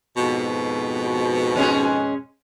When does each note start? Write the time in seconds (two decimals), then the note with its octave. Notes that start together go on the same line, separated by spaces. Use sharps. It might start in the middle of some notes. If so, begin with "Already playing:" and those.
0.17 F2 G#2 B2
1.56 G#3 C#4 G#4